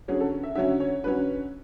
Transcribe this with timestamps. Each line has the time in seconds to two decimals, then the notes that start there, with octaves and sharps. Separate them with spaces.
0.08 D3 F#3 C#4 G#4
0.20 A4
0.43 E5
0.55 D3 F#3 C#4 E5
0.80 C#5
1.04 D3 F#3 C#4 B4